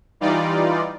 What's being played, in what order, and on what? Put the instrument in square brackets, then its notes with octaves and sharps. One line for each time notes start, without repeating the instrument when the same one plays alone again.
[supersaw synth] E3 G3 D#4 F4 D5